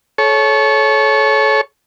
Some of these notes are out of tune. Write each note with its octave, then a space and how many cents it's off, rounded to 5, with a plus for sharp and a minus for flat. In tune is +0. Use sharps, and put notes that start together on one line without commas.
A4 -30 C#5 +0